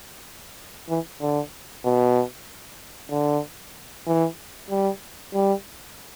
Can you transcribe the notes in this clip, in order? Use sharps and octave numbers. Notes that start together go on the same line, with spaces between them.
E3
D3
B2
D3
E3
G3
G3